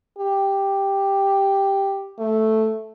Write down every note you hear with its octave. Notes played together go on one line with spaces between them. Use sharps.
G4
A3